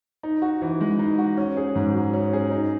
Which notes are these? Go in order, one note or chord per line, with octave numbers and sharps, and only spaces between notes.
D#4
F#4
E3
G#3
D#4
F#4
C#4
G#4
G#2
F#3
C#4
G#4
D#4